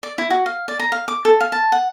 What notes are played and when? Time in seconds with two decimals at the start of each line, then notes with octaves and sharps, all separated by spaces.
0.03 D5
0.18 E4
0.30 F#4
0.46 F5
0.68 D5
0.79 A#5
0.92 F5
1.08 D6
1.25 A4
1.40 F5
1.52 A5
1.72 F#5